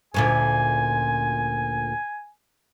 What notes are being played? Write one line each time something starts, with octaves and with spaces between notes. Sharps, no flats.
D2 A#2 C#4 G#5